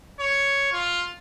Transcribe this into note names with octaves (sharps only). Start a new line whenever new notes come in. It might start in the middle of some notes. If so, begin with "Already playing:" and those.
C#5
F4